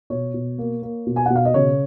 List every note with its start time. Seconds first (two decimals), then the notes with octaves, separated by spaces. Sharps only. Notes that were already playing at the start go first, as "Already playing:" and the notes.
0.10 B2 C#5
0.34 B2
0.58 A#3
0.82 A#3
1.07 B2
1.16 G#5
1.26 B2 F#5
1.35 F5
1.45 D#5
1.54 C#3 C#5